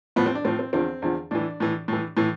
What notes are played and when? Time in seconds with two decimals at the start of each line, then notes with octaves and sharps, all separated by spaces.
0.16 A2 F3 B3
0.26 C4
0.35 D4
0.45 A2 F3 C4
0.59 C4
0.73 E2 D3 F3 C4
1.02 E2 D3 F3
1.31 A2 E3 D4
1.60 A2 E3
1.88 A2 E3
2.17 A2 E3